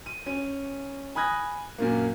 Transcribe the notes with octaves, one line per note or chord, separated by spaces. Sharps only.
D#7
C#4 D#7
G#5 B5 D#6 F#6 G#6 A#6
F#2 A#2 A#3